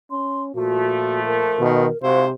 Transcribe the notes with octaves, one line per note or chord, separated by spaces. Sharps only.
C#4 C6
A#2 F3 A3 F#4
A#4
B2 D#3
G#2 C3 E4 F#4 C5 F5